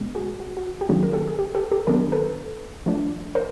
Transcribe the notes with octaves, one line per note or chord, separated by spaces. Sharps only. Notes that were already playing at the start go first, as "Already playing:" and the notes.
Already playing: B2 G#3 B3 D4
F#4 G#4
F#4
F#4
G4
D#3 F#3 A#3 C#4 F#4 G#4
A#4
G4 A4
G#4
G4
G4 A4
G4 A4
D#3 F#3 B3 D4 G#4 A#4
A4 B4
F3 A3 D4
A#4 C5